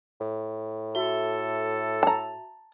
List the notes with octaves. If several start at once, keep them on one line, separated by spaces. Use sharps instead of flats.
A2
F#4 A4 E5 G7
A5 A#5